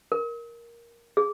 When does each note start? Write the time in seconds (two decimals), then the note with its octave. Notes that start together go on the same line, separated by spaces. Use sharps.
0.12 A#4
1.17 G#4